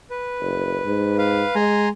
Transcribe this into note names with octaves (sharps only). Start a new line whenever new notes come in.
B4
F#1
G#2
B4 F5
G#3 G#5 A#5 C6